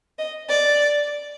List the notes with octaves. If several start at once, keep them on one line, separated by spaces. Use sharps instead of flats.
D#5
D5